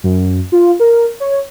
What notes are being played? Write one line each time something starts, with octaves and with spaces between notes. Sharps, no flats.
F#2
F4
A#4
C#5